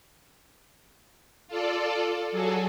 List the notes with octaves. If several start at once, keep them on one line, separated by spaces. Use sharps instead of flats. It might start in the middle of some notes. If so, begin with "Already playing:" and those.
F4 A4 D5
F#3 G#4 A4